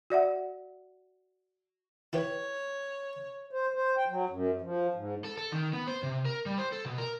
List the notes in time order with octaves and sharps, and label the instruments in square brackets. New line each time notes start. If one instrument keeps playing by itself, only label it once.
[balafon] F#4 D5 E5 F#5
[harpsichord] E4 G4 B4 [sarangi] C#5
[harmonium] C5
C5
G5
F#3
F#2
F3
G#2
[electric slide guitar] A4
A4
D#3
B3
C5
C3
A#4
G3
C5
A4
B2
A#4